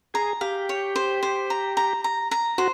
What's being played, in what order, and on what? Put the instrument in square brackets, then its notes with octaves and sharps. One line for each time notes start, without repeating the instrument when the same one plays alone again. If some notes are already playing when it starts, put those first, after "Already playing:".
[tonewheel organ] G#4 [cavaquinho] A#5
[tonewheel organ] G4 [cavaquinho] F5
[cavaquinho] C#5
C5
C5
A#5
A#5
A#5
A#5
[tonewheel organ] F#4 [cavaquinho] C5